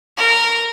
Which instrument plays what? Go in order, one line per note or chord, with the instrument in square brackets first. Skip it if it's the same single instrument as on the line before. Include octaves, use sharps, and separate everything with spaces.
[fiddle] A#4